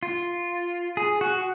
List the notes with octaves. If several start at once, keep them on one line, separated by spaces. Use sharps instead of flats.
F4
G#4
F#4